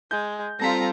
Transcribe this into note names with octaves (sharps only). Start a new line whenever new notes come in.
G#3 G6
G3 C4 F4 A4 A#5 A#6 B6